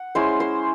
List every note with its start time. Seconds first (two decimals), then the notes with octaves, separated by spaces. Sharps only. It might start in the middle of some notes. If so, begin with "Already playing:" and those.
Already playing: F#5
0.15 G#3 C#4 E4 C5
0.40 C5